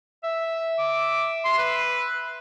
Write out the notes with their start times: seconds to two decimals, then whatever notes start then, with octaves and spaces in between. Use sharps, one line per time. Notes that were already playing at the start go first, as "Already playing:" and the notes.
0.24 E5
0.78 D6
1.45 C6
1.58 B4